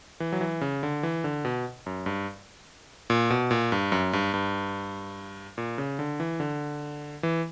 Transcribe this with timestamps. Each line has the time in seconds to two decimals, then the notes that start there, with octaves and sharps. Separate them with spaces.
0.20 E3
0.32 F#3
0.41 E3
0.61 C#3
0.83 D3
1.03 E3
1.24 D3
1.45 B2
1.86 F#2
2.06 G2
3.10 A#2
3.30 B2
3.51 A#2
3.72 G2
3.92 F#2
4.13 G2
4.34 G2
5.58 A#2
5.78 C#3
5.99 D3
6.20 E3
6.40 D3
7.23 E3